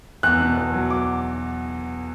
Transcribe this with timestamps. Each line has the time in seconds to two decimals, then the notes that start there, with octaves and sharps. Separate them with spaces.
0.23 E2 F#6
0.40 B2
0.57 E2
0.74 F#3
0.90 D6